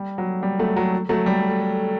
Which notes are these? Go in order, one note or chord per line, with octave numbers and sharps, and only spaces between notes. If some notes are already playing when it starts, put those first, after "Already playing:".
Already playing: G3
F#3
G3
F#3 A3
F#3
F#3 A3
G3